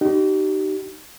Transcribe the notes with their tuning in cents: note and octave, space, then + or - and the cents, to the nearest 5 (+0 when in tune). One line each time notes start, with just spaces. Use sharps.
D#4 -20 G4 -40